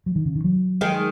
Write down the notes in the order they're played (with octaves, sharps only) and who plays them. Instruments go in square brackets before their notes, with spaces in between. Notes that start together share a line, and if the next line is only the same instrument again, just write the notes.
[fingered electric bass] F#3
D#3
C#3
D#3
F#3
[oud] D#3 G#3